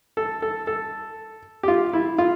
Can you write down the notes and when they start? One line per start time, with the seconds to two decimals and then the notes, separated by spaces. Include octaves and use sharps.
0.17 A4
0.42 A4
0.67 A4
1.63 G4
1.68 F4
1.93 E4
2.18 F4